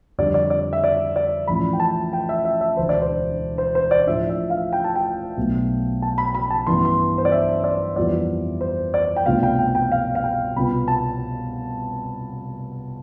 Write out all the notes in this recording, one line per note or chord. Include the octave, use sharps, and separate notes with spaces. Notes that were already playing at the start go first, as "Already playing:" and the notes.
F2 D3 G3 D4 D5
D5
D5
E5
D5
D5
A1 A2 F3 B5
G5
A5
G5
E5
E5
E5
E1 D2 D3 C5
D5
C5
C5
C5
D5
A2 F3 A3 D4 E5
E5
F5
G5
A5
G5
B1 B2 A3
A5
B5
B5
A5
A1 G2 E3 B3 C6
C6
C5
D5
E5
D5
F2 E3 G3 B3 F4 D5
C5
D5
G5
C2 B2 A3 D4 F4 F5
G5
G5
G5
F5
F5
G5
C2 B2 B3 F4 B5
A5